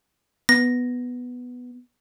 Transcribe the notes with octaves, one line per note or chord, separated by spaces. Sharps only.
B3 A#6